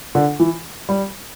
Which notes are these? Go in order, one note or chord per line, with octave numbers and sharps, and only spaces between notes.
D3
E3
G3